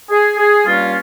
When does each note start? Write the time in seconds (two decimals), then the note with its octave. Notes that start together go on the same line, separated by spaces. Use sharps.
0.10 G#4
0.38 G#4
0.66 G2 G3 A#3 C#4 F4